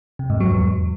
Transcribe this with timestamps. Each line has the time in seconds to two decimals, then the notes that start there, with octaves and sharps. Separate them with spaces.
0.19 C3
0.30 G#2
0.40 F#3
0.51 E2